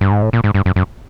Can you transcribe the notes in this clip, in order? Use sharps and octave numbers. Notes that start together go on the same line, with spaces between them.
G2
G#2
A2
A#2
G#2
G2
F#2
F#2